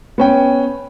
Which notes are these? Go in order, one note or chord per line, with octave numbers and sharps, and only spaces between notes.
B3 C#4 G5